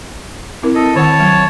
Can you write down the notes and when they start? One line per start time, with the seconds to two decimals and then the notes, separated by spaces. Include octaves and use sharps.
0.63 C4 E4 A#4
0.75 A4 D#5
0.96 D#3 C#5 F#5 A5
1.20 F#3